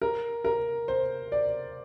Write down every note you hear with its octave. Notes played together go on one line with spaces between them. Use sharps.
A#4
A#4
C5
D5